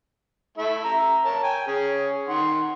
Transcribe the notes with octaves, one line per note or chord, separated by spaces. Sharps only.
A3 E4 E5
E5 A#5
A#4 C#5 A5
G5 G#5
C#4 G#4
D#3 F#5 C6